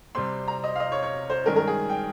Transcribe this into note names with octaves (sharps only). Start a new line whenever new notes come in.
C3 G3 C4 C6
A#5
D#5
F5
D#5
C#5
C#5
C5
G2 D#3 G#3 C#4 A#4
A#4
G#4
G5